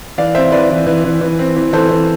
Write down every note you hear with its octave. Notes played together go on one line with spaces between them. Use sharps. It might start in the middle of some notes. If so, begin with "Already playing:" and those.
E3 D5 F5
C4 C5 E5
E3 B4 D5
E3
E3
E3
E3
C4
E3
E3 A4 C5
E3